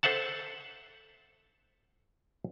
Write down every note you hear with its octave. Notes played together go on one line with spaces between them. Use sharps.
A4 C5 E5 F#5 A5